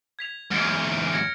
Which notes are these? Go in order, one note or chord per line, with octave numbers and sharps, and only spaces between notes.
G#6 B6 F7
E2 G#2 F6 D7
G#6 A#6 C#7